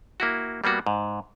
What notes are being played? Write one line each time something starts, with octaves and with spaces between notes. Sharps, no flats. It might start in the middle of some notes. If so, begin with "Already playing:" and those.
A#3 E4 F#4
G3 A#3 B3 F#4
G#2